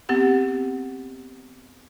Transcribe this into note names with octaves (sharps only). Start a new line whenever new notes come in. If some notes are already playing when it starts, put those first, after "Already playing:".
B3 C4 G4 F#5